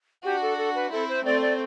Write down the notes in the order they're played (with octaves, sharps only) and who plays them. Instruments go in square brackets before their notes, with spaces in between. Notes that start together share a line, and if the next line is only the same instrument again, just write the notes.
[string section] D4 F#4 [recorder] G4
[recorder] A4
A4
B4
[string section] C4 E4 [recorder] A4
[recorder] C5
[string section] A3 C4 [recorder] D5
[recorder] D5